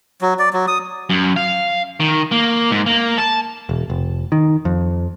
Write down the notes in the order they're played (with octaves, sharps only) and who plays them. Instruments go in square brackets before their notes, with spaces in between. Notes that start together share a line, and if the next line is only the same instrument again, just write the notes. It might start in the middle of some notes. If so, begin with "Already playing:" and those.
[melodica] F#3
D5
F#3
D#6
[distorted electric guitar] F#2
F5
D#3
A#3
G#2
A#3
A5
[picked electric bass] E1
F1
D#3
F2